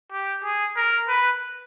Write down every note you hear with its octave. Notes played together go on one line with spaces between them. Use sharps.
G4
G#4
A#4
B4